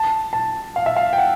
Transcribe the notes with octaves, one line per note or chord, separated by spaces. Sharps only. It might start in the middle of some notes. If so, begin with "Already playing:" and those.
Already playing: A5
A5
F5
E5
F5
G5
F#5